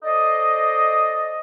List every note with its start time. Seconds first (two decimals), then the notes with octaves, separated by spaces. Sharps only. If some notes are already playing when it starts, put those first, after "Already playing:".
0.03 A4 C5 D5 D#5